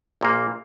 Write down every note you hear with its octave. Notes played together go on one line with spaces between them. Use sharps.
A#1 A#2 A#3